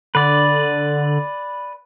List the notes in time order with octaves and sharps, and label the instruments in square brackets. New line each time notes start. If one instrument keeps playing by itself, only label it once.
[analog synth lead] D3 [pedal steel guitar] B4 D5